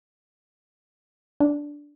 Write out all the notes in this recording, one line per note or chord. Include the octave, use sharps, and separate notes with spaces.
D4